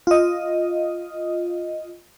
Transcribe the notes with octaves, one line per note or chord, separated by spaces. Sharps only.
F4 D#5